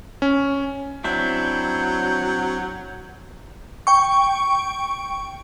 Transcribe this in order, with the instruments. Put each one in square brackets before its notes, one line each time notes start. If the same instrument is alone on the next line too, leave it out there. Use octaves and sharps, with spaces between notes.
[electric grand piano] C#4
[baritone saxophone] F#3 [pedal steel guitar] C4 D4 E4 [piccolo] G6
[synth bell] G5 C#6